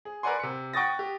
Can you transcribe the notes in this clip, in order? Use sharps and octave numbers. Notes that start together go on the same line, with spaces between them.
G#4
A#4 B4 D5 F#5 G#5 C6
C3 C#7
F#5 G5 C#6 D#6 A6 A#6
G4